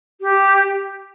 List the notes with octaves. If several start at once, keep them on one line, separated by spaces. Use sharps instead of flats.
G4